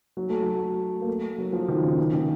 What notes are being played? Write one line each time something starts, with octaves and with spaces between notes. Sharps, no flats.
F#3
A3
F#3
A#3
A3
F#3
F3
D#3
C#3
D#3
D#3